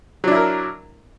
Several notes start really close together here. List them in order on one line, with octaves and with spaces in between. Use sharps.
F#3 D4 E4 A#4